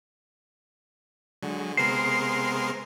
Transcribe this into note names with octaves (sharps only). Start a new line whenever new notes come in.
D3 F#3 G#3
C3 G#3 B3 A#4 C6 C7